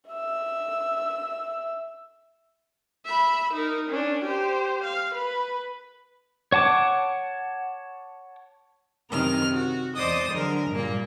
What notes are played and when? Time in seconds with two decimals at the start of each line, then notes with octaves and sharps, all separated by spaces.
0.11 E5 E6
3.05 E5 B5
3.53 D#4 A#4
3.90 C#4 D4
4.25 G4 C5
4.84 F5
5.14 B4
6.52 C#5 F#5 A5 D6
9.11 F#2 C3 D#3 A#4 F6
9.53 F#4
9.95 E2 C5 D5 D#5 D#6
10.33 D3 F#3 G#3 A#4
10.70 G2 A#2 A#3